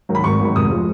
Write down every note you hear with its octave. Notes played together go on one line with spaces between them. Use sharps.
G#2 D#3 F#3
B5
G#1 C#6
G#2 D#3 F#3
F1 D#6
F3 G#3